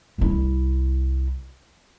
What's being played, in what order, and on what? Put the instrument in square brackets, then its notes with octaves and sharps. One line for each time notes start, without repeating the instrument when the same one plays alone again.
[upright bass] C2 E4